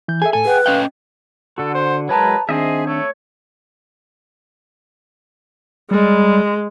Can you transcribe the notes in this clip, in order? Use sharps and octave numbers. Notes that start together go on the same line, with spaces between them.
E3 G6
G#4 A4 E5 G#5
A2 A4 G#5
G#4 B4 F#5 G5
C#4 D#5 F5 G5
D3 F#4 A4
C5
F#3 G#3 A#4 B4 C#5 A5 A#5
D#3 C4 D4 G#4 C5 D#5 E5
A3 C#5
G3 G#3